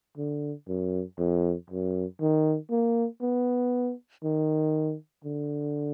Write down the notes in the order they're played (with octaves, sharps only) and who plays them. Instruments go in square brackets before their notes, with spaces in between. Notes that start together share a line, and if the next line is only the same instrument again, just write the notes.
[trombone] D3
F#2
F2
F#2
D#3
A#3
B3
D#3
D3